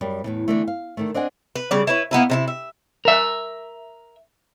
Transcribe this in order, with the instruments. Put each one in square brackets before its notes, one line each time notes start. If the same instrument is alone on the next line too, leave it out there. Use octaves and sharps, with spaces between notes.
[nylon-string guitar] F#2 G3
E2 A2 C#3
D3 E3 A3
F5
D3 D#3 A3
C4 D4 D#5 F#5 G#5
[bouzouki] B4
C#3 G3 D5
E4 B4 C#5
A#3 B3 D#4 E4
C3 D#4 E4
E5
[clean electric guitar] A#4 E5